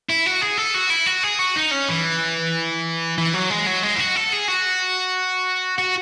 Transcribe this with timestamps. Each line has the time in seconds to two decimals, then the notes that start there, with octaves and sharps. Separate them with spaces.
0.09 E4
0.26 F#4
0.41 G#4
0.57 A4
0.74 F#4
0.90 E4
1.07 F#4
1.23 G#4
1.39 F#4
1.56 D#4
1.71 C#4
1.88 E3
3.18 E3
3.34 F#3
3.50 G#3
3.67 F#3
3.83 G#3
3.96 E4
3.99 F#4
4.16 A4
4.32 G#4
4.48 F#4
5.78 F#4